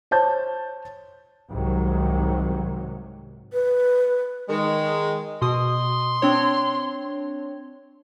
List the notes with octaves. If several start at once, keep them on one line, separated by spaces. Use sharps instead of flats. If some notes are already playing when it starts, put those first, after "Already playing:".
C5 C#5 A5 G6
C2 G#2 C3 D#3 F#3
B4
D#3 G#3
B2 C6 D#6
C4 D4 C#5